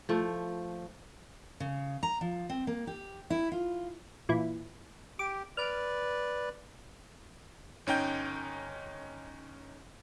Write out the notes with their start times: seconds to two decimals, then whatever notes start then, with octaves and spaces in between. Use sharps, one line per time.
0.09 F3 A3
1.60 C#3
2.03 A#5
2.21 F3
2.49 C4
2.67 A#3
2.87 G4
3.30 E4
3.52 F4
4.29 A#2 E3 E4
5.19 G4 D6
5.57 B4 D5 F6 D7
7.87 G1 C#4 D#4 G5 G6